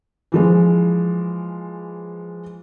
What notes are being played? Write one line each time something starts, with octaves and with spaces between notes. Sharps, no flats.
E3 F3 G#3